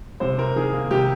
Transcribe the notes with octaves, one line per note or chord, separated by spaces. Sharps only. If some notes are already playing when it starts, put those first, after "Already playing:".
C3 C5
C3 A#4
D#3 G#4
A#3
C3 G4